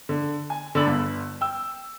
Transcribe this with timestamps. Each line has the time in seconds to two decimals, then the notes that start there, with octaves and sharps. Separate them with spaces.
0.09 D3
0.50 G#5
0.75 D3 D5 B5 E6 F#7
0.87 G1
1.41 G5 E6